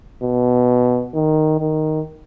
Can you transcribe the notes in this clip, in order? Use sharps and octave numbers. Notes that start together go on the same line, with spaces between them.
B2
D#3
D#3